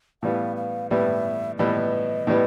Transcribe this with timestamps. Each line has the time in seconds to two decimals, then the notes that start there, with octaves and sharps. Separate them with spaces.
0.22 A2 E3 G3 B3 F5
0.56 F5
0.90 A2 E3 G3 B3 E5
1.58 A2 E3 G3 B3 D#5
2.27 A2 E3 G3 B3